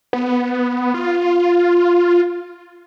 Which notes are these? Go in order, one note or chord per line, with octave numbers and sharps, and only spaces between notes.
B3
F4